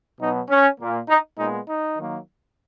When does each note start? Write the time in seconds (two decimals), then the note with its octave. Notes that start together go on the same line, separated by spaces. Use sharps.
0.20 B2 F#3 B3 D#4
0.49 C#4
0.79 A#2 A#3
1.09 D#4
1.38 A#2 G#3 B3 D#4
1.68 D#4
1.97 D#3 F#3 A#3